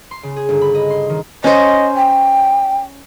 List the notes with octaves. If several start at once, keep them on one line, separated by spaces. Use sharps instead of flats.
C6
C#3
G#4
G1
B5
D#5
C6
D#3
C#4 C5 D#5
G5